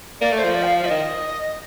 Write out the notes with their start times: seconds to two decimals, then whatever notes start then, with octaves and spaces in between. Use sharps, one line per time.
0.21 A#3 D5
0.33 A3
0.39 C5
0.44 F3
0.55 D5
0.63 G5
0.67 F5
0.79 F3 F5
0.86 D5
0.90 D#3 D#5